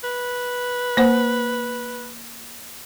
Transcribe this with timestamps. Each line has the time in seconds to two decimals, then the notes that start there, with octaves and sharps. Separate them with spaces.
0.04 B4
0.97 A#3 C5 F#5